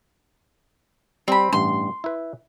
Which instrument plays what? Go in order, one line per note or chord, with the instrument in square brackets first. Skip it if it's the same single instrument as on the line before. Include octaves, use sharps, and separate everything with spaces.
[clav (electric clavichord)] G3 [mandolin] C4 B5
[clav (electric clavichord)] A1 G2 [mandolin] C6
[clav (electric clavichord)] E4 B4